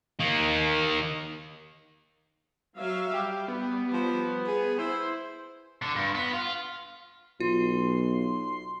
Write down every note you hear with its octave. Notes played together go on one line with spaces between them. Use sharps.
D#3 A#3
F#3 E5 F5
G3 G4
B3
F3
G#4
E4 C5
D3
G2
B3
F4
B1 F4 C6